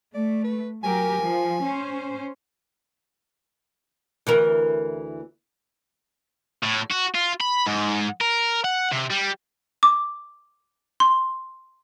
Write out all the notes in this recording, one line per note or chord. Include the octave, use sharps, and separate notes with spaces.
A3 D5
B4
F#3 G4 A#4 G#5
F3
C#4 C5
D2 E3 A#4
A2
F#4
F4
B5
G#2
A#4
F#5
C3
G3
D6
C6